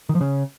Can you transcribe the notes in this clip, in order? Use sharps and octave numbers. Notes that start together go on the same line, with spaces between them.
D#3
F3
C#3